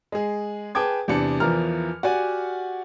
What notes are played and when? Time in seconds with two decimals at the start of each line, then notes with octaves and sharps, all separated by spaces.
0.12 G#3 G#4
0.75 G#4 B4 G5 A5 D6 G#6
1.08 E2 C3 D4 C#7
1.40 E2 E3 F3 A#4 A#5 F6
2.03 F#4 G4 D5 F#5 G#5